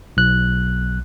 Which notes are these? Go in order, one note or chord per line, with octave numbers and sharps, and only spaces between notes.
B1 F#6